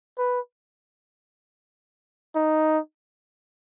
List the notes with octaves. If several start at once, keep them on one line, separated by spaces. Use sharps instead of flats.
B4
D#4